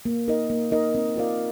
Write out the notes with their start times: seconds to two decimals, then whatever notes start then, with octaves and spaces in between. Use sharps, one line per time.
0.05 A#3
0.28 D#4 A#4 D#5
0.50 A#3
0.72 D#4 A#4 D#5
0.95 C4
1.16 F4 A#4 D5 F5